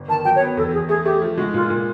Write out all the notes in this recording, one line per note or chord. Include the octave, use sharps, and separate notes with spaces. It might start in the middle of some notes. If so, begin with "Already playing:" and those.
Already playing: G1
D#3 A5
F#3 G5
C#5
B3
E2 A4
E2 G#4
A3 G#4
A3 G4
F3
G#3 F#4
A#2 F4
A#2